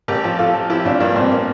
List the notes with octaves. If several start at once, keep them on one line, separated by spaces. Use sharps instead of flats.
A1 G4 A#4
F3
F3 F4 A4
F3
F3 E4 G4
A1 D4 F4
G2 A#3 D4
A1 C4
A#3